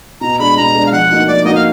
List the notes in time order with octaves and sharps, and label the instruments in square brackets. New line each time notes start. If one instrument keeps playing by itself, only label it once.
[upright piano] B2 [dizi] A#5
[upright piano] G#3 D4 [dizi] B5
[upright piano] B2 [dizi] A#5
[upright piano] G#3 D4
[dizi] F5
[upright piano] F3 [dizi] F#5
[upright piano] A#3 D#4 F#4
[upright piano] F3 [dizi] D5
[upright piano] A#3 D#4 F#4 [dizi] D#5
[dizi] F5